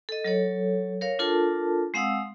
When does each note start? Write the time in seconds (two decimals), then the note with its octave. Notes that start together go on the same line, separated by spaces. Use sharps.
0.09 A4 D#5
0.24 F#3 A4 C#5
1.01 A#4 C#5 F5
1.19 D4 F4 A4 A#4 A5
1.94 G#3 C4 F5 F#5 D#6 E6